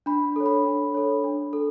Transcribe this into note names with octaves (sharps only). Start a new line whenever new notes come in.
D4 B5
A4 C#5
B5
D4
A4 C#5
D4
A4